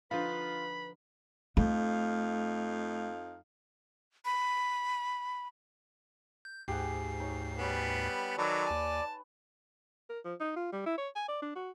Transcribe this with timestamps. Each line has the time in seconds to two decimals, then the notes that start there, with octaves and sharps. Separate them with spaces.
0.11 D3 F3 D#4 F4 B4 F5 B5
1.57 F2 A3 D#4 F5
4.25 B5
6.45 G6
6.68 D2 G#2 G4 G#4 F#5 C7
7.20 D#4 C#5
7.58 G3 B3 C#5 G#5
8.38 D#3 F#3 A4 B4 D5
8.67 D#2 G#5 A5
10.09 A#4
10.25 F3
10.40 D#4
10.56 F4
10.73 G3
10.86 E4
10.98 C#5
11.16 G#5
11.28 D5
11.42 D4
11.56 F#4